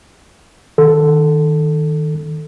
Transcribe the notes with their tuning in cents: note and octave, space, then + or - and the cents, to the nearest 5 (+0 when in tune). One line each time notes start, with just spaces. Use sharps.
D#3 +0 A4 +0